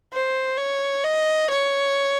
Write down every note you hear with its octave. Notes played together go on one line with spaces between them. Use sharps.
C5
C#5
D#5
C#5